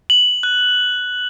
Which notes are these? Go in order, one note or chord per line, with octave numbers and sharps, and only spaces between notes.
F#7
F#6